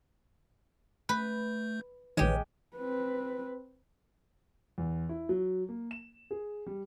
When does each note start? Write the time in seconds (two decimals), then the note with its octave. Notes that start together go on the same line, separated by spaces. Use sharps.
1.09 A3 B4 G6
2.17 A#1 D#3 G#3 G4 B4 C#5
2.77 C4 B4
4.78 E2
5.09 E4
5.29 F#3
5.69 A#3
5.91 E7
6.31 G#4
6.66 G3